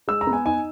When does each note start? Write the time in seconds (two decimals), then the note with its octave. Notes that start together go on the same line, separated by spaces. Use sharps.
0.08 G#3 E6
0.21 A#5
0.27 B3
0.33 G#5
0.46 D#4 G#5